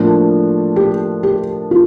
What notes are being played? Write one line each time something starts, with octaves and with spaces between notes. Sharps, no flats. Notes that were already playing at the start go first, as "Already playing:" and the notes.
Already playing: A2 F3 A#3 D4
G4
G4
F4